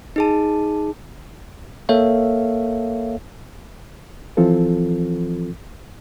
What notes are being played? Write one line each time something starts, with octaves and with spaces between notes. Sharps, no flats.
D#4 G#4 A5
A#3 A4 A#4 C#5 E5 F5
E3 F3 C4 F4 A4